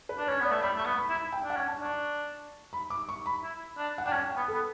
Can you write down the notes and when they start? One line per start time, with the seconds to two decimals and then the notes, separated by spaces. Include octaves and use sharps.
0.09 B4
0.18 D4
0.27 C#4 C#5
0.40 B3 D5
0.52 A3
0.63 G3 B5
0.77 A3 C#6
0.86 B3
0.97 B5
1.09 E4
1.15 B5
1.33 G5
1.44 D4
1.50 F#5
1.56 C#4
1.68 A5
1.79 D4
1.85 C#6
2.73 B5
2.90 D6
3.09 C#6
3.26 B5
3.43 E4
3.78 D4
3.98 F#5
4.06 D4 G5
4.13 C#4 A5
4.31 G5
4.36 B3
4.48 A4
4.54 B3